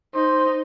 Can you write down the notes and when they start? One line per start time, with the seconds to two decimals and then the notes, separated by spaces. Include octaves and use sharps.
0.14 D#4 C5